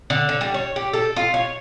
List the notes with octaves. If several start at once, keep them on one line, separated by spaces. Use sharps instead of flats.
D3
D3
G3
C#5
G4
A4
F4
C#5